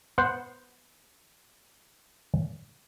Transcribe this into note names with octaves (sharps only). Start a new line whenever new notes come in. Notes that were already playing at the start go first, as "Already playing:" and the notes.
B3 C5 F#5